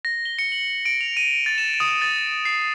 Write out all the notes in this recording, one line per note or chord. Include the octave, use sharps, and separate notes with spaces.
A#6
G7
C#7
F#7
D7
F7
D#7
A6
E7
D#6
A6
C7